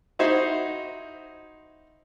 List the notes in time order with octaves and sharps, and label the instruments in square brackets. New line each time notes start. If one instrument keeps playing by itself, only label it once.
[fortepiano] D#4 E4 F#4 C5 E5